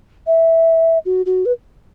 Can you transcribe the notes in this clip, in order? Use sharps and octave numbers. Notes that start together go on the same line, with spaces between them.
E5
F#4
F#4
B4